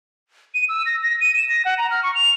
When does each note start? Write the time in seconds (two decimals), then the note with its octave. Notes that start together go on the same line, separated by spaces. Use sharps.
0.54 D#7
0.69 E6
0.86 A#6
1.03 A#6
1.21 D#7
1.37 E7
1.49 A#6
1.65 F#5
1.78 A#5
1.91 F6
2.03 C#6
2.15 F7